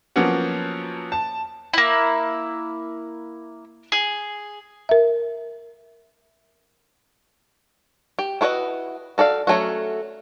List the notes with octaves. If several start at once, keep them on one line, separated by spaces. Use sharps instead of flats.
F3 F#3 A#3 B3 C#4 F#4
A5
A#3 E4
G#4
A#4 E5
G4
E4 F#4 B4 C#5 D#5
F#4 A4 D5 F5
F#3 A3 C#4 F#4